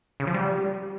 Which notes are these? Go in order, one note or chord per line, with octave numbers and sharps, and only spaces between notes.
C#3
F3
G3